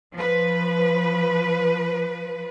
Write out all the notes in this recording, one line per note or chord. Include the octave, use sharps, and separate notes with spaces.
F3 B4